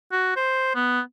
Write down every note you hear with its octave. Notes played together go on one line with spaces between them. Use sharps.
F#4
C5
B3